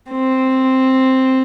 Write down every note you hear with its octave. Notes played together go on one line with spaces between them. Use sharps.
C4